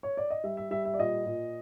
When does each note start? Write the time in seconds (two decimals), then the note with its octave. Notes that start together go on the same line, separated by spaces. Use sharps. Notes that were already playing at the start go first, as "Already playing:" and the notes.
0.03 C#5
0.17 D5
0.30 D#5
0.44 G3 E5
0.57 E5
0.71 G3 E5
0.85 E5
0.94 D5
0.99 A#2 D#5
1.26 A#2